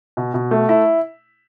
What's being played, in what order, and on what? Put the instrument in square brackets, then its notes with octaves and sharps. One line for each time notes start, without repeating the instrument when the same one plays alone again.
[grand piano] B2
B2
A3
E4